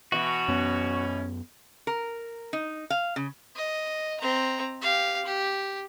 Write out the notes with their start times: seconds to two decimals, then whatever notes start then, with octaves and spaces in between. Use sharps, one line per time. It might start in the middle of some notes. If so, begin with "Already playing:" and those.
0.12 B2 E3 F#4
0.48 F#2 B3 C#4
1.87 A#4
2.53 D#4
2.90 F5
3.16 C#3
3.56 D#5
4.20 C4 A#5
4.82 G4 F5
5.25 G4